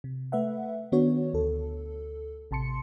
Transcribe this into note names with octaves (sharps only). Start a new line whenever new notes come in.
C3
A3 B4 E5 F#5
D#3 B3 D4 F#4 C#5
D2 A4
A1 C3 A5 C6 C#7